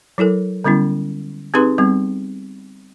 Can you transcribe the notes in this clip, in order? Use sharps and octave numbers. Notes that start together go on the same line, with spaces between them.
F#3 E4 A4 A#4
D3 G3 B3 C#4 E4
C4 D#4 G4 G#4 B4 C6
G3 B3 C4